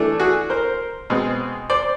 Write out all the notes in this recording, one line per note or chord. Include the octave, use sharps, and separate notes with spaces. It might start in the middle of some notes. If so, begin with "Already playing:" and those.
Already playing: E3 A3 D4
F#4 G#4
A#4 C5
B2 G#3 C4
C5 D5